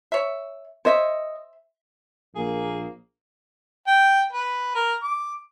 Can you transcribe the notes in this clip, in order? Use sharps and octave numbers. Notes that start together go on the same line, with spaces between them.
C#5 E5
C5 C#5 D#5 E5
A#1 A#3 G#4
G5
B4
A#4
D6